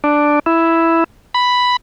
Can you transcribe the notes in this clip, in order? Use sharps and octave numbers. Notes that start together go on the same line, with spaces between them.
D4
E4
B5